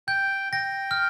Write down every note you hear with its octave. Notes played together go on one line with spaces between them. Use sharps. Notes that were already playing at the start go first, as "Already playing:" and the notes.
G5 G6
G5 A#6
F6